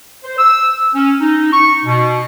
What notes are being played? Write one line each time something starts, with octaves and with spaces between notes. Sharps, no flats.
C5
E6
C#4
D#4
C#6
B2